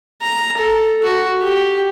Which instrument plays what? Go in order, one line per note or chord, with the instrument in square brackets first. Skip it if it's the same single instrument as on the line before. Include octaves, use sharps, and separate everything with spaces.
[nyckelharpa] A#5
A4
F#4
G4